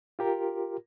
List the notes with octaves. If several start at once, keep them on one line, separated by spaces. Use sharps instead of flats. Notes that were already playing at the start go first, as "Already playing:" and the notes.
F4 G4 A#4